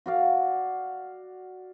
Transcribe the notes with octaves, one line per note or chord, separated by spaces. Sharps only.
F#4 D5 F5